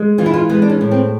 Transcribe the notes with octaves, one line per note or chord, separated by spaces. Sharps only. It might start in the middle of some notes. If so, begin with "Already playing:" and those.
Already playing: G#3
E3 F4
E4
F4
G#3 B3
D4
C#4
A2
C4